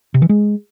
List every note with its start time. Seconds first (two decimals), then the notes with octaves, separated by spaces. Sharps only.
0.14 C3
0.22 E3
0.29 G#3